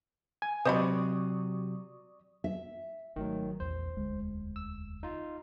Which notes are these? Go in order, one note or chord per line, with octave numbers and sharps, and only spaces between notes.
G#5
C3 F#3 C5 D5 D#5 B5 C#6 D#6
E5
G#1 D#3 F#3 A3
A#1 E2 C5
E1 D2 G#3
E6
D#4 F4